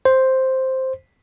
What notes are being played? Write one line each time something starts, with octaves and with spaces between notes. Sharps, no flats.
C5